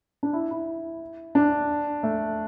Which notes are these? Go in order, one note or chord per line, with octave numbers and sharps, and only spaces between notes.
D4
E4
E4
D4
A3